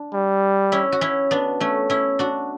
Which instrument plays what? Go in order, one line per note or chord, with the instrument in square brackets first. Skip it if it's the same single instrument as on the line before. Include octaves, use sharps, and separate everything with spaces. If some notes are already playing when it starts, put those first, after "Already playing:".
Already playing: [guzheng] D4
[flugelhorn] G3
[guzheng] C#4 E4
F#4
C#4 E4
B3 D4
A3 C#4
C#4 E4
D4 F#4